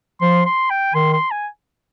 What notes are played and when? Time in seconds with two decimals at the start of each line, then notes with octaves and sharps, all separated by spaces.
0.21 F3 C6
0.45 C6
0.70 G5
0.94 D#3 C6
1.13 C6
1.31 G#5